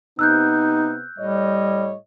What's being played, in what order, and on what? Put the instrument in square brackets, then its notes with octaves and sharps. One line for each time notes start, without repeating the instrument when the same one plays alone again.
[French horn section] C3 B3 [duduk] D#4 [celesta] E6 F#6 G6
[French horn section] A2 C#5 D#5 [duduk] G3